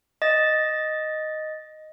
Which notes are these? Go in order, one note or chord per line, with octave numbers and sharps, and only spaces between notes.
D#5 A6